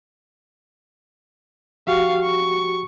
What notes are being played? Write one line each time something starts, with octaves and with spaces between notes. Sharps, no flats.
F3 F#4 G4 F5 C#6
C#6